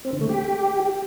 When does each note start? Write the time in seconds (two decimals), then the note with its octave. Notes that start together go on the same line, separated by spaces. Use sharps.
0.05 C4
0.13 D3
0.21 A3
0.29 G4